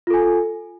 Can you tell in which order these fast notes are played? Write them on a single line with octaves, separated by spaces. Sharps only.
F4 A4 G#5